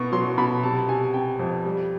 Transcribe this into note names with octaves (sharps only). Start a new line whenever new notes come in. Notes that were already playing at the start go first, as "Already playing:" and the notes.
Already playing: B2 B3 C#6
F#3 C6
B2 B5
C3 A5
C3 G#5
C3 G5
F2
G3